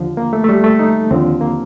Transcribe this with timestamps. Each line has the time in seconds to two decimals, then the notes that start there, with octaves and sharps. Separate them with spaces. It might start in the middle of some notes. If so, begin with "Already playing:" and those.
Already playing: D#2 D3 F3
0.17 A#3
0.33 A3
0.44 A3
0.49 G3
0.64 A3
0.79 D#4
1.10 D#2 D3 F3 C4
1.41 A#3